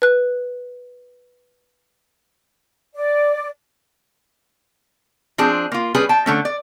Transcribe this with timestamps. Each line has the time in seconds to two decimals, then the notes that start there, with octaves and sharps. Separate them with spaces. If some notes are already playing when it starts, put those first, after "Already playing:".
0.02 B4 F#6
2.94 D5
5.38 F3 C4 D4 G#4
5.72 A#3 F4
5.95 G3 C#4 G#4 B4
6.09 G5 A5
6.26 D3 A3 C#4
6.45 D5